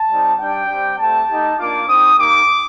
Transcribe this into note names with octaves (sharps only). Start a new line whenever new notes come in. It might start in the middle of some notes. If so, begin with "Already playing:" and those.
Already playing: A5
G3 C4 D#4
G3 D4 G4 G5
G3 C4 G4
A3 C4 G4 A5
A3 D#4 G4
A#3 D4 F4 D6
C4 D#4 G4 D#6
A#3 D#4 G4 D6